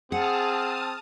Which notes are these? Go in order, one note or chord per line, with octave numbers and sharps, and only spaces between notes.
C4 G#4 F#5 A5 D#6 F6